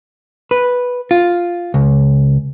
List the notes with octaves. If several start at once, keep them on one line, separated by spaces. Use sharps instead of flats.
B4
F4
C#2